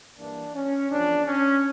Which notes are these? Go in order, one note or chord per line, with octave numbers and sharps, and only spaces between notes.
G2 E3 A#3 D4
C#4
E2 C#3 F3 D4
C#4